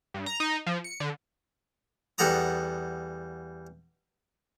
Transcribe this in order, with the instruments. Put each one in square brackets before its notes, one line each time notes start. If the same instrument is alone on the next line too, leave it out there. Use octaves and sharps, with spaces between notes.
[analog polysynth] G2
A#5
D#4
F3
C#7
D3
[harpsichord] E2 G3 A4 F#5 A#5 D#6